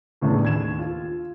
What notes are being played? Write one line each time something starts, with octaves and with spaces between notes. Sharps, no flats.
E2 A2 C#3 A3 D4
D#2 G#6 E7
F4